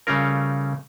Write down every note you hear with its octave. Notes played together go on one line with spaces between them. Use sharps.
C#3 G3 A3 C#4 F4 A#4